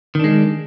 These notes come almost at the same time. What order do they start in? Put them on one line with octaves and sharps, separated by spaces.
D#3 D4 G#3